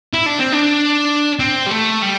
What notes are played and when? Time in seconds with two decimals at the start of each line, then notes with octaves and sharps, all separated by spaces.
0.14 E4
0.26 D4
0.39 C4
0.52 D4
1.39 C4
1.67 G3
1.71 A3
2.02 G3